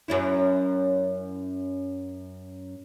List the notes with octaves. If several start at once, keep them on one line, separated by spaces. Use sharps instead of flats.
F#2 C#4 E4